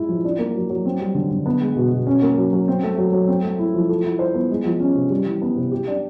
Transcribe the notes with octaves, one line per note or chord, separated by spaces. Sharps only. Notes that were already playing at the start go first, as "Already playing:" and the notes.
Already playing: A2 G#3 E4
F3
D4
A#3
F#3
F#3
C4
G3
D3
D3
B3
G#3
B2
B2
C#4
A#3
F#3
F#3
C4
A3
F#3
F#3
C4
A3
E4
F3
A4
E4
C5
B3
G#3
F3
C#4
C3
G3
E3
B3
C3
G4
D4